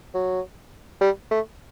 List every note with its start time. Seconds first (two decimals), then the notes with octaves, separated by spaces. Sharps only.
0.14 F#3
1.01 G3
1.31 A3